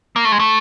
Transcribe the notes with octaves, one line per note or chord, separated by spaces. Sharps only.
A#3
A3
G#3
A3